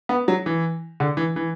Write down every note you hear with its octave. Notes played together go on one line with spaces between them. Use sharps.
B3
F#3
E3
D3
E3
E3